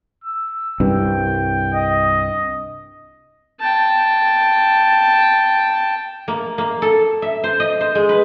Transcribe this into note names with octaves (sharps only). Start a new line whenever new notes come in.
E6
C2 G2 G5
D#5
G5 A5
A#3
A#3
A4
E5
C5
D#5
C5
G#3
B4